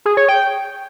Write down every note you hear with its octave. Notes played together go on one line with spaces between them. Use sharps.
G#4
C#5
G5